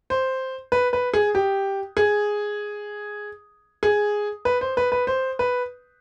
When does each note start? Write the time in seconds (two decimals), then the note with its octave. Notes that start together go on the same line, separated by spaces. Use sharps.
0.10 C5
0.72 B4
0.93 B4
1.14 G#4
1.35 G4
1.97 G#4
3.83 G#4
4.45 B4
4.61 C5
4.77 B4
4.92 B4
5.07 C5
5.39 B4